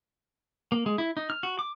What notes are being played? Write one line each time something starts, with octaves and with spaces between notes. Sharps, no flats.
A#3
G#3
E4
D#4
F6
F#4
D6